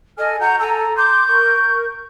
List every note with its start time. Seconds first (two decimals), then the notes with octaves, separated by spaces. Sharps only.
0.18 A4 D#5 G#5 F6
0.40 F#4 F#5 A#5 G6
0.60 A4 G#5 A#5 E6
0.97 C6 D6 G6
1.27 A#4 C#6